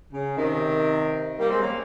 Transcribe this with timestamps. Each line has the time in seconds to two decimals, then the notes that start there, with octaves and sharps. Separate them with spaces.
0.13 C#3
0.36 C3 D#3
1.39 G3 A#3
1.50 G#3 C4
1.62 A#3 C#4